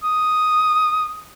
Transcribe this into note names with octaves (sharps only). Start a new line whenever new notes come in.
D#6